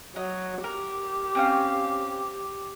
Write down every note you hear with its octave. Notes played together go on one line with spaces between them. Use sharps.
F#3 D#5
G4 A#4
C4 C#4 F5